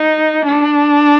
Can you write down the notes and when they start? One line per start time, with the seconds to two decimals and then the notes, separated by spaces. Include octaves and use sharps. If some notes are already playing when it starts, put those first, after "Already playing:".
Already playing: D#4
0.45 D4